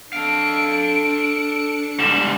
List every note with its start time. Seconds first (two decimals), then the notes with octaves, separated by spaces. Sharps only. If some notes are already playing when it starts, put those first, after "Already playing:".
0.13 D4 A4 F5 C#7 D7
1.99 G#2 G3 E7